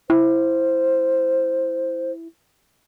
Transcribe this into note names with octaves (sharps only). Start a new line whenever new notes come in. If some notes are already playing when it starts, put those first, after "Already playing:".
E4 C5